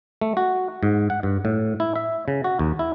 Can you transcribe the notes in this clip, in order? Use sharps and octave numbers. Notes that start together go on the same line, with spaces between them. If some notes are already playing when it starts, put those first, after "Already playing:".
A3
F#4
G#2
F#5
G2
A2
E4
E5
C#3
F#4
D#2
E4